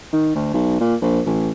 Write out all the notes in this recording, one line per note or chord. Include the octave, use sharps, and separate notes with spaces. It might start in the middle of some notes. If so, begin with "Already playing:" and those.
D#3
D2
B1
A#2
A#1
A1